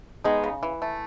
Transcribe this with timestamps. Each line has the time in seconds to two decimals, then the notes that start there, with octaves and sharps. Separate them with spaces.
0.24 G#3 B3 D#4
0.44 C#3
0.63 E3
0.82 A3